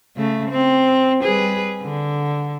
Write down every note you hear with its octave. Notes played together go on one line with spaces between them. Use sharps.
C#3 A3
C4
G3 G#4 B4
D3